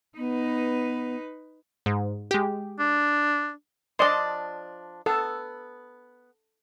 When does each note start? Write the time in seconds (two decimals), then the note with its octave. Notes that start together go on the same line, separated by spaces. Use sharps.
0.18 B3 D#4 B4
1.86 G#2
2.31 G#3 G4
2.79 D4
3.99 F3 D4 D5 D#5 C6
5.06 B3 A4